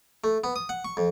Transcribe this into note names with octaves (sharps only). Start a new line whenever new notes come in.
A3
B3
D#6
F#5
C#6
F2